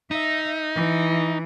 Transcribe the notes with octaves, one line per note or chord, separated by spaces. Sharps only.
D#4 E5
E3